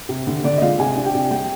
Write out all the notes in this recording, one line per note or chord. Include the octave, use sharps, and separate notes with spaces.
C3
D3
D3 D4 D5
D#5
G#3 F4 F5
C3 G#4 G#5
D4
G4 G5
C3
G3 G4 G5